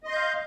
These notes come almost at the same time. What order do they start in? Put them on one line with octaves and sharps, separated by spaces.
D#5 C6 G6 F5